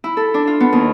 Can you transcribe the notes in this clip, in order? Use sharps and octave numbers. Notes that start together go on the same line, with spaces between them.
E4
A4
D4
F4
B3
D#2